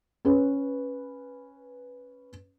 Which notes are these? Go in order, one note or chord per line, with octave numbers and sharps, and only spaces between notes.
C#4 B4